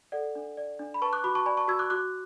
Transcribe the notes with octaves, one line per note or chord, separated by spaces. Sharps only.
A4 D5 F#5
D4
D5
D4
B5
B4 A5 C#6
D6 F#6
F#4 B5 D6
A5 C#6
D5 G#5 B5
A5 C#6
F#4 E6 G#6
D6 F#6
F#4 D6 F#6